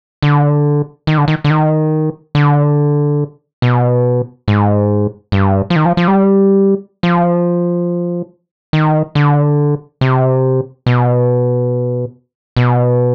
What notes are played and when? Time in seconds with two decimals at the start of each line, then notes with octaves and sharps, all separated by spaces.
0.22 D3
1.07 D#3
1.18 D3
1.28 D#3
1.44 D3
1.50 D#3
2.35 D3
3.62 B2
4.48 G#2
5.32 G2
5.70 F3
5.76 D#3
5.85 F3
5.97 F3
6.08 G3
7.03 F3
8.73 D#3
9.15 D3
10.01 C3
10.86 B2
12.57 B2